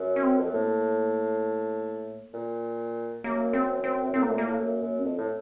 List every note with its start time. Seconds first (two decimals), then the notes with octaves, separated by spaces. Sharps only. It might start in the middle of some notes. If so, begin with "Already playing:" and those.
Already playing: F#2
0.16 C#4
0.23 C4
0.39 F2
0.47 F#2
0.53 A2 A#3
2.34 A#2
3.24 F#2 A#3
3.53 C4
3.84 C4
4.03 F#2
4.14 A2 C4
4.22 A#3
4.30 A#2 A3
4.38 A#3
4.46 A2
4.59 F#2
4.82 F#2
4.99 C#4
5.04 F2 C4
5.18 A2